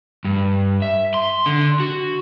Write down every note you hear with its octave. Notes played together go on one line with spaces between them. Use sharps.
G2
E5
C6
D3
F#4